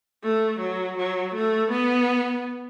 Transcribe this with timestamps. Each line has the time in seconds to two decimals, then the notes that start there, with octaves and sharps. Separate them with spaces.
0.23 A3
0.60 F#3
0.98 F#3
1.35 A3
1.71 B3